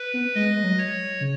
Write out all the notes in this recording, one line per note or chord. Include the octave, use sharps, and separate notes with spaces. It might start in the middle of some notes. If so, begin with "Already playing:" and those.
Already playing: B4
B3
G#3 D#5
G#3
F#3
C#5
C#3